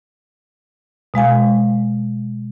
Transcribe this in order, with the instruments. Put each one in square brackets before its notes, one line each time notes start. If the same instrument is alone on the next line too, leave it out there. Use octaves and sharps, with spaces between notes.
[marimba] B2 G#3 F5 G#5